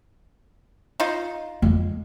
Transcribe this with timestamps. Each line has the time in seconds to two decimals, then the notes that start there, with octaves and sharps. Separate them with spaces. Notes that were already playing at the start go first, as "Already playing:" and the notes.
1.00 D#4 F4
1.62 F2 G#3